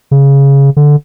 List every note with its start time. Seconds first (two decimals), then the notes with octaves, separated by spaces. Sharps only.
0.11 C#3
0.77 D3